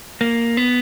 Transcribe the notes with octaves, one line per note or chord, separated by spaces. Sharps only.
A#3
B3